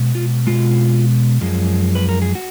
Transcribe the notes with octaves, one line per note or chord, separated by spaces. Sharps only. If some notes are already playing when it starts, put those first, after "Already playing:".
Already playing: B2 G#3
F4
B2 G#3 F4
F#2 F3 G#3
B4
A#4
G#4
F#4